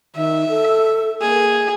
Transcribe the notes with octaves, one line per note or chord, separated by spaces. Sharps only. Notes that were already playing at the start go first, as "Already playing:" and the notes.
D#3 E5
A4
A#3 G#4